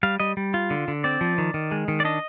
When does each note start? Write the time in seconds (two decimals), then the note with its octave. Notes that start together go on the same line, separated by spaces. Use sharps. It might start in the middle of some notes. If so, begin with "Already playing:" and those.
0.03 G3 F5
0.20 G3 D#5
0.37 G3
0.54 F4
0.70 D3
0.88 D3
1.04 C4 D5
1.21 F3
1.38 D#3
1.54 D#3
1.71 G#3
1.88 D#3
2.00 D5
2.05 D4 D#5